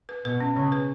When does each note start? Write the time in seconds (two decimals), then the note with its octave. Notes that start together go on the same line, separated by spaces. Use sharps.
0.09 B4
0.24 B2 B4
0.40 C#4
0.55 C#3 C#4
0.72 B4